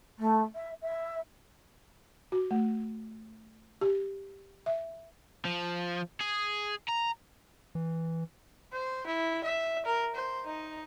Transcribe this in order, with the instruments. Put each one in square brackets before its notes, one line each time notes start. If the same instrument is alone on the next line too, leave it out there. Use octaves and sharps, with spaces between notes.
[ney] A3
E5
E5
[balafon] F#4
A3
G4
E5
[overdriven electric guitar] F3
G#4
A#5
[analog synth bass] E3
[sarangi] C5
E4
E5
A#4
C5
D#4